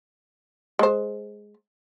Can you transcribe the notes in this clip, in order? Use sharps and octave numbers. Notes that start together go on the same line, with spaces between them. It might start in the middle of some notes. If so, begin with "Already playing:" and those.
G#3 C5